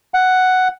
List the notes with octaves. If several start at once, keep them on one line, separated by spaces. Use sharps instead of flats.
F#5